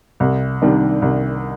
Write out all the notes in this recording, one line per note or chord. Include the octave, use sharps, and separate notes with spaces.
C2
C3 D#3 G3 D4
C2